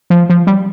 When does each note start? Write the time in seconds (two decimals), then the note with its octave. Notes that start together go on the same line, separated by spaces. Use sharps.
0.10 F3
0.30 F3
0.47 G3